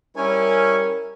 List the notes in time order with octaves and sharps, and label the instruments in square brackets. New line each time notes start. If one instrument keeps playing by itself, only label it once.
[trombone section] G3 C#4 [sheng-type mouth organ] E4 C#5 G#5 [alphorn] A#4